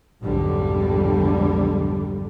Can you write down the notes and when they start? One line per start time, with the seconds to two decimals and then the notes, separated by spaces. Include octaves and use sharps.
0.23 B1 F2 G#2 D3 G3